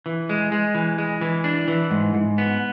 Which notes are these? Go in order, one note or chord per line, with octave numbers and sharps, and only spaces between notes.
E3
G#3
G#3
E3
G#3
E3
D4
E3
G#2
G#2
B3